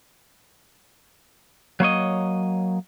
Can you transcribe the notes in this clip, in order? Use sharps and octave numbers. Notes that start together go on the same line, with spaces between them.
F#3 A#3 C#5 D#5